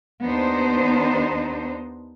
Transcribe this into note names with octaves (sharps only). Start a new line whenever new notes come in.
D#2 B3 D4 D#4 C5